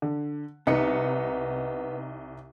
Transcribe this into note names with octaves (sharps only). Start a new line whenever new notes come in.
D3
C2 B3 D#4 B4 C#7